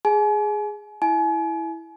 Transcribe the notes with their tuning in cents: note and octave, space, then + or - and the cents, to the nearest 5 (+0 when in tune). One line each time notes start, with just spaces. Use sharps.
G#4 +0 G#5 +40
E4 +0 G#5 +40